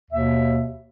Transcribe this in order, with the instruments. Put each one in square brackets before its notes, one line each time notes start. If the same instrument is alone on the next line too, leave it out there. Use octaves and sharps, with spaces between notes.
[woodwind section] D#2 B2 E5